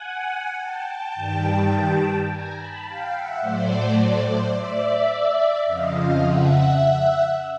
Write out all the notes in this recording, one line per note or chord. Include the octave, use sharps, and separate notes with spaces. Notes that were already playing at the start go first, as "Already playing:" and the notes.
Already playing: F#5 G#5
G5 A5
G5 A5
G2 D#3 G3
G#5 A#5
A5 B5
F5 G5
E5 F#5
A2 F#3 A3 C5 D5
C5 D5
C5 D5
D5 E5
F2 C#3 F3 D#5 F5
D#5 F5
E5 F#5